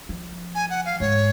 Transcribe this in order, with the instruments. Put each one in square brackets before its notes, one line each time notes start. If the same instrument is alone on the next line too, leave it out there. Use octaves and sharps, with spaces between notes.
[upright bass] F3
[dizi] G#5
F#5
F5
[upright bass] G#2 [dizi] C#5